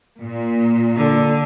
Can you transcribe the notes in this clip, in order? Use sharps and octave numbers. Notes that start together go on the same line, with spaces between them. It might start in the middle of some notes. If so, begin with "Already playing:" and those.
A#2
D3